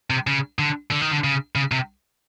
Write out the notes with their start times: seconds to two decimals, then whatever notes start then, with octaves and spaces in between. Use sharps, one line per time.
0.10 C3
0.27 C#3
0.59 D3
0.91 D3
1.01 D#3
1.11 D3
1.24 C#3
1.56 C#3
1.72 C3